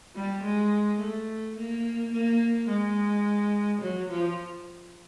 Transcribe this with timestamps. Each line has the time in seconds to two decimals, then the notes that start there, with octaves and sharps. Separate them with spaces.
0.16 G3
0.44 G#3
1.00 A3
1.57 A#3
2.13 A#3
2.69 G#3
3.82 F#3
4.10 F3